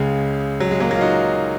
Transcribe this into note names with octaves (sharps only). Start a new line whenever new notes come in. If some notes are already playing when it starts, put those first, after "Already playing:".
Already playing: C#2 C#3 G#3
F#3
G#3
F#3 A#3
F#3 A#3
F4
D#4 F#4